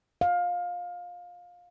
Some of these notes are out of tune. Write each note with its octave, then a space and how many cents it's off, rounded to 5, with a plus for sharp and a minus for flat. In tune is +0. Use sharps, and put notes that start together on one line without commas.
F5 +20